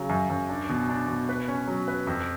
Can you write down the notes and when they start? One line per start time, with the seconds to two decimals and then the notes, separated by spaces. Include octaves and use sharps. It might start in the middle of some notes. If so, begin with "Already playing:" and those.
Already playing: C#3 F#3
0.09 F#2
0.30 F#2
0.49 D4
0.69 B2
0.89 D4
1.08 B2
1.29 B4
1.48 C#4
1.68 F#3
1.88 B4
2.07 F2